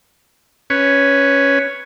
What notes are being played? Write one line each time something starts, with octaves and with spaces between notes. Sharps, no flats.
C#4 B4 C#5